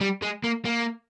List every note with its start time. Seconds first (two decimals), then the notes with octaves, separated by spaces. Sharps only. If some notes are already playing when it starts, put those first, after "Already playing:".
0.01 G3
0.22 G#3
0.44 A#3
0.65 A#3